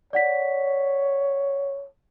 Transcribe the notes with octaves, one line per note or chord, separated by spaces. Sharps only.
C#5 D5 F#5 B6